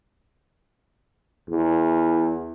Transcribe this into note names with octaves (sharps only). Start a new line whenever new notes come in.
E2